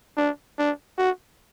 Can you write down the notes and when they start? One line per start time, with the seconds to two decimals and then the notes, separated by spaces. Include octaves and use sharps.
0.17 D4
0.58 D4
0.98 F#4